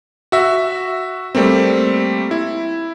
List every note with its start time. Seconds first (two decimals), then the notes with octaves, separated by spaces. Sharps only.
0.32 F#4 E5
1.35 G3 A3 A#3 C4
2.31 E4